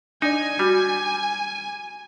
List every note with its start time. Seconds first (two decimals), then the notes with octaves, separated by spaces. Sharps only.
0.22 D4 D#4 D5 G#5
0.59 G3 F#4